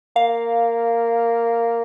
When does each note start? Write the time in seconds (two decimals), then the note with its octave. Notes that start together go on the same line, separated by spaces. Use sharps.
0.16 A#3 F5